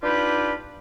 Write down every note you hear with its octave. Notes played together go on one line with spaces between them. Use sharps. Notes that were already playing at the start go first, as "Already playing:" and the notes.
D4 D#4 F4 G4 B4